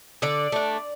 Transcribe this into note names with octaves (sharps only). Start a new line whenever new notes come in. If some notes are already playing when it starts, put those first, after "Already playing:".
D3 D5
A3 D4